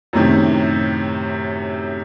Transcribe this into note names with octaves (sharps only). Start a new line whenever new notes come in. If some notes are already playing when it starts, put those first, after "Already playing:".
F#2 A2 C3 D#3